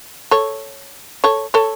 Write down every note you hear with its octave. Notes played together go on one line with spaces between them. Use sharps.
A4 C#5
A4 C#5
A4 C#5